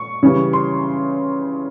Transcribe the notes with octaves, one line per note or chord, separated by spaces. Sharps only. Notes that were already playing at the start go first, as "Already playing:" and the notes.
Already playing: C#6
C#3 E3 G3
C6